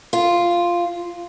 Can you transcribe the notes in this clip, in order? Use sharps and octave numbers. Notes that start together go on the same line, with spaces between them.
F4